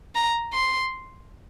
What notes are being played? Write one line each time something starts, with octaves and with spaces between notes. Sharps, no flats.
A#5
C6